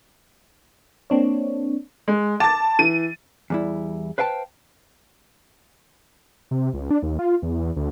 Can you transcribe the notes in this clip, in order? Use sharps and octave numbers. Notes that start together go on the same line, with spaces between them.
A#3 C4 D4 C#5
G#3
A5 D6 A6
E3 D#7
E2 G3 E4
B4 C5 F5 G5 A5
C3
C#2
D4
D#2
F4
E2
D2